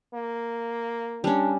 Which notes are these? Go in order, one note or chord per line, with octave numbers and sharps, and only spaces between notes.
A#3
G3 C#4 D4